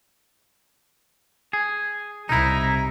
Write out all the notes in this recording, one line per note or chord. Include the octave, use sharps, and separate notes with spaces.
G#4
C2 D#4 E4 A#5